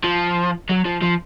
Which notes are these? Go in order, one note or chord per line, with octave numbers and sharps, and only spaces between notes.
F3
F#3
F3
F3